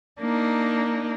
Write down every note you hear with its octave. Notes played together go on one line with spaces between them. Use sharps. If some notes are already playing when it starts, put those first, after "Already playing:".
A#3 D4 D#4